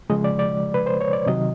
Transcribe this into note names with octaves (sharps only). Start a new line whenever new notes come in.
C#3 F3 G#3 D#5
D5
D5
B4
C5
C#5
D5
C3 D#3 F#3 D#5